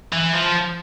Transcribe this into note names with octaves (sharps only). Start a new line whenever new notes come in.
E3
F3